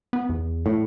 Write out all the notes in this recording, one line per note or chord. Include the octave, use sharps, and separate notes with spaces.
B3
E2
A2